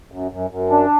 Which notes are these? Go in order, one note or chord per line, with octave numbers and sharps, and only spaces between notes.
F#2
F#2
F#2
D4